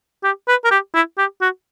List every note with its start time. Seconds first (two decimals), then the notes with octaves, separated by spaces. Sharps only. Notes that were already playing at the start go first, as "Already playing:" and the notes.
0.24 G4
0.48 B4
0.65 A#4
0.71 G4
0.94 E4
1.18 G4
1.42 F#4